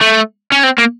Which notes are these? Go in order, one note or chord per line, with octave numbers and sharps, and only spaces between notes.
A3
C#4
C4
A#3